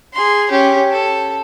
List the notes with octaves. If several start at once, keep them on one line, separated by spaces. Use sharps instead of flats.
G#4 C6
C#4 G4
A4